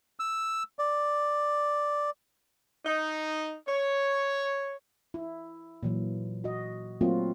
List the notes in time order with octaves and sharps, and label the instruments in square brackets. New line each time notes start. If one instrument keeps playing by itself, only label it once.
[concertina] E6
D5
[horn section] D#4
C#5
[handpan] E4
A#2 E3 F#3
F#4 D#5
F#3 A3 A#3 C4 F4 F#4